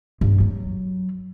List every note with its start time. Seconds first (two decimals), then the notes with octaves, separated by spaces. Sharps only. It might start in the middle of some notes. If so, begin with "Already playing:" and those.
0.21 G2
0.40 F#3